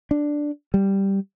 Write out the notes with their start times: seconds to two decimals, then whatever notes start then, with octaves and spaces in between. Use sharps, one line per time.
0.11 D4
0.74 G3